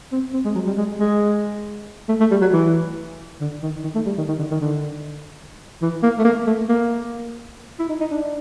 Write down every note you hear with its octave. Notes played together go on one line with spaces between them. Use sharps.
C4
C4
G#3
F#3
G3
G#3
G#3
A3
A3
G3
F#3
E3
D3
D#3
D#3
A3
G3
D#3
D#3
D3
D#3
D3
E3
A#3
A3
A#3
A3
A#3
E4
D#4
D#4
D4